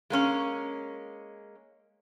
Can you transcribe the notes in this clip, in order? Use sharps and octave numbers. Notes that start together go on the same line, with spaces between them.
G#3 A#3 C#4